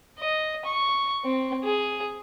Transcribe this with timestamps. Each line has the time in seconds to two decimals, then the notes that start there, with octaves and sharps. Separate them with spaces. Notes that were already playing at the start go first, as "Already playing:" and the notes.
0.19 D#5
0.65 C#6
1.24 C4
1.64 G#4